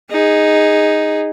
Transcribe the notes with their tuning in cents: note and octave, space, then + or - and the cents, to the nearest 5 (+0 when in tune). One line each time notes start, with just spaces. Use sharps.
D#4 +0 G#4 -15